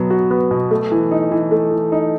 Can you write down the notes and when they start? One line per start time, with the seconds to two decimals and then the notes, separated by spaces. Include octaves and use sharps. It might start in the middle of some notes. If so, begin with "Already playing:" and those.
Already playing: B2 F#3 B3
0.10 F#4
0.31 B3
0.51 B2
0.71 A3
0.92 E3
1.11 D#4
1.31 E3
1.51 A3
1.71 E3
1.92 D#4